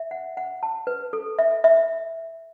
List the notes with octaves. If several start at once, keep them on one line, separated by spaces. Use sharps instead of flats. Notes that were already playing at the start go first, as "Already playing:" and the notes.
Already playing: E5
F#5
F#5
A5
B4
A4
E5
E5